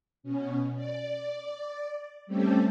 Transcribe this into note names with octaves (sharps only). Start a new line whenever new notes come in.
B2 C#4
D5
G3 A3 C4 C#4 G4 A4